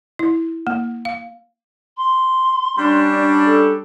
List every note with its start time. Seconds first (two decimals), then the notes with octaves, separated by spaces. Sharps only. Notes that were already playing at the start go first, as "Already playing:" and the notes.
0.19 E4
0.67 A#3
1.05 F5
1.97 C6
2.78 G3 C#4 D4
3.45 A4